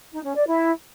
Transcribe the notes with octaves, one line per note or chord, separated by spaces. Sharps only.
D#4
C#4
D5
E4